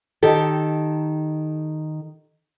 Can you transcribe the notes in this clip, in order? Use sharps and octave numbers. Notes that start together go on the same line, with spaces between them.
D#3 G4 A4